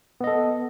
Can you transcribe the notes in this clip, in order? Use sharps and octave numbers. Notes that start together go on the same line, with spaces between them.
B3 A4 D#5